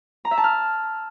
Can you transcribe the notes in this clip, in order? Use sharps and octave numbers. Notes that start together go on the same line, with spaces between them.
A#5
E5
A5
F6